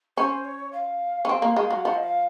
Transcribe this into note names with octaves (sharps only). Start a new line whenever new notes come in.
C#4 C5
C#5
F5
C#4
C4
A#3
G#3
F#3
F3 F#5
D#5
F5